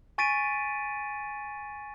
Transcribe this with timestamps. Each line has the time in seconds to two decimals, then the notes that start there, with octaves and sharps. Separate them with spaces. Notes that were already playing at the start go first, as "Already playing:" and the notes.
0.18 G#5 C#6 A6 B6 D7 D#7